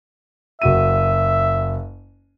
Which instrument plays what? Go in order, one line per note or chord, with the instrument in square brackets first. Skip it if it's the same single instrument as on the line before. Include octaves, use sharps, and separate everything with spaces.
[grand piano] F#1 F#4 D#7 [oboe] E5